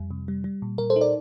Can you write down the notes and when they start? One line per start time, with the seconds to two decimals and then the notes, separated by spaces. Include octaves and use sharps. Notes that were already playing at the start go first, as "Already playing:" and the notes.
Already playing: F2 G3
0.11 C3
0.28 G3
0.44 G3
0.62 A#2
0.78 A#2 A#4
0.90 A4 C5
0.96 D#4
1.01 A#4 D5